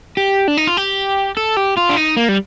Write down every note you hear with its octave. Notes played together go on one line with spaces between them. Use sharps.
G4
D4
D#4
F4
G4
A4
G4
F4
D4
D#4
A#3
G3